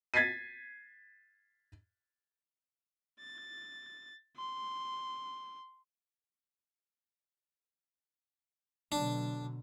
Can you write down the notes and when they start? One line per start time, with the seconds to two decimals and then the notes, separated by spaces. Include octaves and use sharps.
0.14 G#6 A6 B6 C7 D#7
3.20 A6
4.37 C6
8.92 B2 D3 F#3 D4